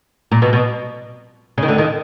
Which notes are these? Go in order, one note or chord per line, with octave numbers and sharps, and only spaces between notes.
A#2
B2
B2
C#3
D#3
D2 D3
D#2 D#3